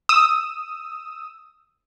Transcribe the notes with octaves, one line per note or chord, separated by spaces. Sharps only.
D#6 E6